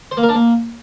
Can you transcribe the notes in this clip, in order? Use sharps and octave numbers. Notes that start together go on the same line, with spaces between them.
C5
A#3
A#4
D4
A#3